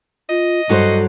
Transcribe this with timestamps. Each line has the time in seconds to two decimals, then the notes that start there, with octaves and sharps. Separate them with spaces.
0.29 F4 D#5
0.69 G2 F#3 F#4 A4 C5